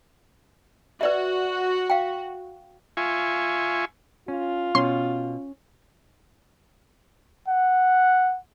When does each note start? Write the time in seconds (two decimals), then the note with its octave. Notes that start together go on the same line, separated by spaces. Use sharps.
1.01 F#4 B4 D5 E5
1.90 F5 G5
2.97 F4 E5 G#5 C#6
4.28 C#4 F4
4.75 B2 C#4 C6
7.48 F#5